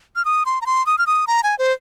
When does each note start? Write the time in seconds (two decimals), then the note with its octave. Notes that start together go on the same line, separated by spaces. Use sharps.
0.16 F6
0.25 D#6
0.46 C6
0.61 A#5
0.66 C6
0.86 D#6
0.98 F6
1.07 D#6
1.27 A#5
1.43 G#5
1.59 C5